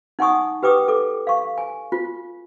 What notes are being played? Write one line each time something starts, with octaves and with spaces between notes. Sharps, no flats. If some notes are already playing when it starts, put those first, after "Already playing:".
D#4 F#5 G#5 C#6 D#6
G4 B4 G5 D6 D#6
A4 D6
F5 C#6
G#5
F4